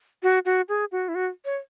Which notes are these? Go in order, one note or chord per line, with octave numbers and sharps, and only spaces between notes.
F#4
F#4
G#4
F#4
E4
F#4
C#5